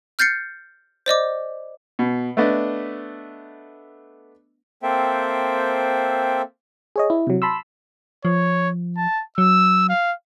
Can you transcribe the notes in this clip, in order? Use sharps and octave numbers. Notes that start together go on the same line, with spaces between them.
F6 G6 A6 C7 C#7
C5 D5 D#5 D6
B2
A3 B3 D4 D#5
A#3 C4 A4 C5 E5 G5
G#4 C#5 D#5
E4
C3 F#3
A5 B5 C6 E6
F3 C#5
A5
F#3 E6
F5